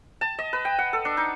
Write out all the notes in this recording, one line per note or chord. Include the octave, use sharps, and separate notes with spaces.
A5
D#5
B4
G5
F#5
A4
D4
D#4